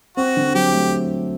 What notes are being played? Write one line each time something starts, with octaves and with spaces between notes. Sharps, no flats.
C4 F#4
D3
F#3 G4
A3